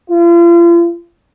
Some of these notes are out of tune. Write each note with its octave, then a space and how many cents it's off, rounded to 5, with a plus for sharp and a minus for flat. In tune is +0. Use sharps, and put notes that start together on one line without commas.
F4 -40